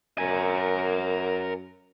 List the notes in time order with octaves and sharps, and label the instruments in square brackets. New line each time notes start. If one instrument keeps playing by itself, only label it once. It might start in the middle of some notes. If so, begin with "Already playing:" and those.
[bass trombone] F#2 [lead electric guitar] A#4 G#5